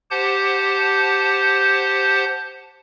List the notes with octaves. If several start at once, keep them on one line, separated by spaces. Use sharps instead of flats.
G4 C5 F#5 A5 G6